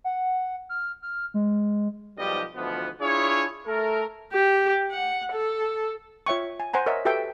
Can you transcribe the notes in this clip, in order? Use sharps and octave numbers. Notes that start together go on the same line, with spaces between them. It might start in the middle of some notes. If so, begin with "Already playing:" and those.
F#5
F6
F6
G#3
B1 G#2 F3 G3 G4 D#5
D2 B2 E3 F3 B3
D4 E4 F4 G#4 C#5
A3 A4 A#4
G4
F#5
A4
F4 C#5 E5 G5 C#6
G#5
C5 F#5 G#5 A#5
A#4 C#5 D#5 E5 F#5
F#4 G4 A4 B4 E5 G5